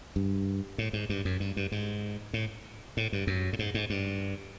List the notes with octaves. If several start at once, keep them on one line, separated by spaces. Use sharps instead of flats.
G2
A2
G#2
G2
F#2
G2
G2
G#2
A2
A2
G2
F#2
A2
G#2
G#2
G2